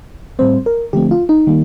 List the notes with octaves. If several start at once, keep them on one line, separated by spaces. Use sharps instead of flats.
A2 G3 C4 C5
A#4
D3 F3 A3 C4 G4
F4
D#4
D#3 G3 A#3